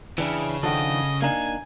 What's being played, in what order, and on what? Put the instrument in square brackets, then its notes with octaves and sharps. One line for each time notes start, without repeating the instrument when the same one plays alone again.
[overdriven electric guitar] C#3 [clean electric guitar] E3 D4 E4 [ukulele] G5
[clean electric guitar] D#3 F3 D4 [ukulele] A4 F#5 G5 [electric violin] D#5
[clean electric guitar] A#3 D4 D#4 [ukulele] F5 A#5 [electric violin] G#5